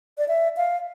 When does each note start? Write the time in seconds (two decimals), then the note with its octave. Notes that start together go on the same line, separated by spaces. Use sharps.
0.18 D5
0.28 E5
0.57 F5